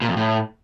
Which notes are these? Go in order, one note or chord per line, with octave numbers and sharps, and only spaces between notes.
A#2
F2
A2